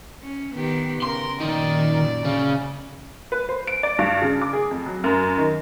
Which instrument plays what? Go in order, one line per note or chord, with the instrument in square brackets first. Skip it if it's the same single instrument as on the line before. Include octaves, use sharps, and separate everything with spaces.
[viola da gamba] C#4
D#3 B3 G4
[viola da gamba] C#3 A#4 [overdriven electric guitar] C6
[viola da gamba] F#2 A#2 D5 [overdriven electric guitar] D#3
[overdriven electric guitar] C#3
[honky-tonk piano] B4
C5
D7
D5
G2
C#3
D6
G#4
F2
F#3
F#2
D#3